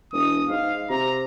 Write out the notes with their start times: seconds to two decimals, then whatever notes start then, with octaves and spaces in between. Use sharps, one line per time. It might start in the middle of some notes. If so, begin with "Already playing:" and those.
0.13 E1 D#6
0.49 G#2 F5
0.90 C3 A#5